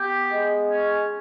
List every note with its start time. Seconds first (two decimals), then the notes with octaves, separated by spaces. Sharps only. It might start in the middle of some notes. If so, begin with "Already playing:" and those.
Already playing: B3 G4
0.31 G#3
0.70 C#4